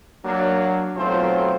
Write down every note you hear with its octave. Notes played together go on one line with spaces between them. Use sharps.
F#3 A#3 D4
B1 F#3 A3 C4 F4 C5